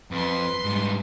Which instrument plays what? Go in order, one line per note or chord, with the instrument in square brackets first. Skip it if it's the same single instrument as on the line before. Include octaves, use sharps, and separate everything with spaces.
[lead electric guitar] F2 [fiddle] B4 C6
[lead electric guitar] G#2 G3